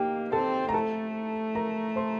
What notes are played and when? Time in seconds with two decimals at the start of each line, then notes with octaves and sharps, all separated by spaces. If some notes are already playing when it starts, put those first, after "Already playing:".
Already playing: A#3 D#4 G4 F5 G5
0.32 C4 A4 A5
0.69 A#5
0.73 A3 A4 A5
1.55 A#4 A#5
1.96 C5 C6